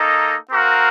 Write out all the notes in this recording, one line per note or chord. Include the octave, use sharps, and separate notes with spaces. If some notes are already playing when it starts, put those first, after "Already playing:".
Already playing: A#3 D#4 A4 D#5
C4 F#4 A#4 F5